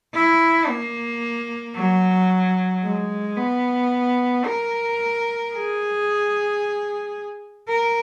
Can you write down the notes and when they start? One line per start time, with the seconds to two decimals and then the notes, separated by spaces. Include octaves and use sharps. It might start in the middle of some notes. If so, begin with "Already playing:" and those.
0.14 E4
0.69 A#3
1.76 F#3
2.83 G#3
3.37 B3
4.46 A#4
5.53 G#4
7.68 A#4